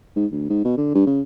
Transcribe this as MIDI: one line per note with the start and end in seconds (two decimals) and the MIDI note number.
0.16 0.26 44
0.32 0.49 38
0.49 0.61 44
0.65 0.77 47
0.77 0.91 50
0.95 1.05 43
1.07 1.21 49